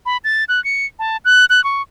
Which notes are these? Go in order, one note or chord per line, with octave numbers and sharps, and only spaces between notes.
B5
A6
F#6
C#7
A5
F#6
F#6
C#6